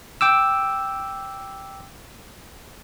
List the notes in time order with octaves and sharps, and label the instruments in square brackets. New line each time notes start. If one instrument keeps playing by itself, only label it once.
[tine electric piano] G5 D6 E6